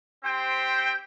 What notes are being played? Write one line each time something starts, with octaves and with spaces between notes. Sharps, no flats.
C4 G4 C5 G5